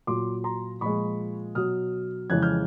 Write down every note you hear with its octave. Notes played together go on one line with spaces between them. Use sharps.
A#2 F#3 C6 D6
A#5 C6
A#2 F3 G#3 B5 C#6
B2 F#3 D#6 F6
F2 C#3 E3 G#3 F#6 G#6
F6 G6